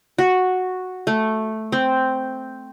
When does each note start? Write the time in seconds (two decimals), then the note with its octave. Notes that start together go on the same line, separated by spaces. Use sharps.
0.18 F#4
1.07 A3
1.72 C4